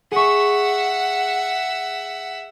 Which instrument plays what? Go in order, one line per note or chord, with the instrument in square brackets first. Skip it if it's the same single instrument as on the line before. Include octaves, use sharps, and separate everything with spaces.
[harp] G#4 C#6 [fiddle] E5 F#5